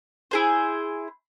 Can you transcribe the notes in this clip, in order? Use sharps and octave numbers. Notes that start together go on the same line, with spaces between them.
E4 G#4 C5